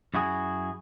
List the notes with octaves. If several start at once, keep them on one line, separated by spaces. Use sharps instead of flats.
F#2 E4 F#4 G#4